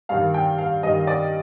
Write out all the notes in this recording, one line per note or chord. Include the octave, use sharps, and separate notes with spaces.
G2 D#3 F5
G5
F5
G2 D#3 D#5
D5